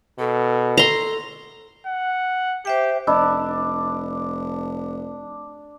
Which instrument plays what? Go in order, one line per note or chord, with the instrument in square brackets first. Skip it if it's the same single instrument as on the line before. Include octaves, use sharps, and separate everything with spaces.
[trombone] B2 [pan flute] A4
[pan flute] A4 [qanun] A#5 C6
[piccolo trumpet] F#5
[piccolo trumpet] G4 [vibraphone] C5 E5 G5
[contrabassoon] F1 [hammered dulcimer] D4 [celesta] D#5 B5 E6